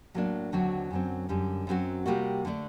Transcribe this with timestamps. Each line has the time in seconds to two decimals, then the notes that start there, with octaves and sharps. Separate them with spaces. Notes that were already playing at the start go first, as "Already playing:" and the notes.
0.14 A2 F#3 A#3 D4
0.52 D#2 D3 F#3 C4 F#4
0.91 F#2 D3 F#3 C4
1.29 F#2 D3 G3
1.67 F#2 F#3 C4 F#4
2.06 C3 G3 A#3 F#4
2.45 D3 A3 D4